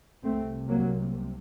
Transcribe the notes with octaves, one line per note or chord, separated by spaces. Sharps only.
C2 C3 A3 C4
F#3 A#3